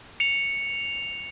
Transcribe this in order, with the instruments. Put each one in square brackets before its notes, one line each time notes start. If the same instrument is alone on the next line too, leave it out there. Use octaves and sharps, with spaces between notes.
[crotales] C#7 F7